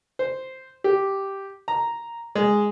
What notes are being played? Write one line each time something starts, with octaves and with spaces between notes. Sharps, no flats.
C5
G4
A#5
G#3